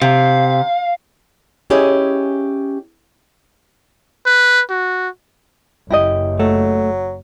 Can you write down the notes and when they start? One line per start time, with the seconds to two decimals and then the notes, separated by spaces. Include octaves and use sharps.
0.02 C3 F5
1.70 C#4 E4 G4 G#4 C#5 D#5
4.26 B4
4.70 F#4
5.90 F#1 E4 G4 D#5
6.40 F#3 A3